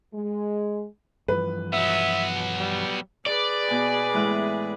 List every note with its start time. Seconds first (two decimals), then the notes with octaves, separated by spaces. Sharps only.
0.14 G#3
1.28 G2 E3 F3 B4
1.73 F#3 B3 E5
2.58 G3
3.26 G#4 B4 D5
3.68 B2 G#5
4.14 A2 E3 G#3